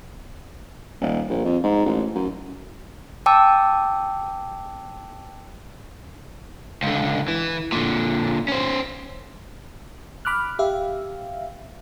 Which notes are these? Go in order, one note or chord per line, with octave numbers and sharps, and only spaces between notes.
D#1
A#1
F2
G#2
A1
F#2
G5 A5 D6 E6
C#2 D3
E3
A#2 D3
C#4 C5
B5 D6 F6 F#6
G4 E5 F5